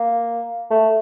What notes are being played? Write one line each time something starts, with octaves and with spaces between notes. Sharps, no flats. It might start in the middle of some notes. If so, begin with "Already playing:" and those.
Already playing: A#3
A3